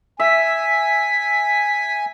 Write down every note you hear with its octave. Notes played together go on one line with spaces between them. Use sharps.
E5 G#5 B6